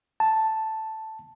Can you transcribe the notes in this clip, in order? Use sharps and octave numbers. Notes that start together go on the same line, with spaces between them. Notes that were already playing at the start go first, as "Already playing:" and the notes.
A5